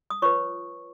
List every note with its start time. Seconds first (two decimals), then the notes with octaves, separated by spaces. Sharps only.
0.10 D#6
0.22 F4 B4 C#5 C#6